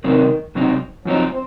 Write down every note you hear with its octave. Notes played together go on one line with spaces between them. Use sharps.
C3 D#3 F#3 C4 D#4
C3 F#3 C4 D#4
F#2 F3 F#3 C4 D#4
C4